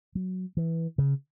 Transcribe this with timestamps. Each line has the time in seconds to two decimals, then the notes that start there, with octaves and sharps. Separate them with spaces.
0.15 F#3
0.57 E3
0.98 C#3